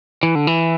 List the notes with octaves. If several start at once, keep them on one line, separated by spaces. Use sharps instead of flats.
E3
D3
E3